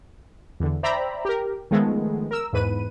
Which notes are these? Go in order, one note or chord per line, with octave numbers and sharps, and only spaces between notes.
E2 D3
C5 D5 E5 G5 A#5 B5
G4 A#4
D#3 F3 G#3 A3 B3
A#4 E6
E2 G#2 B4 D#7